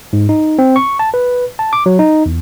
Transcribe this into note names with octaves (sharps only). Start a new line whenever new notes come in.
G#2
D#4
C4
C#6
A5
B4
A5
D6
F#3
D#4
E2